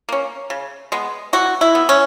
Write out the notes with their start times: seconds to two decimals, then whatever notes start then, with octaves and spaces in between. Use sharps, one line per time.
0.09 A#3 C#4
0.50 C#3
0.92 G#3 B3
1.33 E3 F#4
1.61 E4
1.75 B3
1.89 C#4